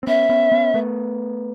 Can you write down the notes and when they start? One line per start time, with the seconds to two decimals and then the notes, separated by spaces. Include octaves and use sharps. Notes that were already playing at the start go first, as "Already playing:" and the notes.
0.03 C4
0.07 B3 C#4 E5
0.29 B3 C#4
0.52 B3 C#4
0.74 A3 B3